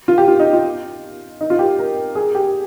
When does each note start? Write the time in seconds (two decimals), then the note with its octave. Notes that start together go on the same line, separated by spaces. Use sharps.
0.08 F4
0.18 G4
0.28 F4
0.39 D#4
0.53 F4
1.41 D#4
1.50 F4
1.59 G4
1.79 A#4
2.15 G#4
2.35 G4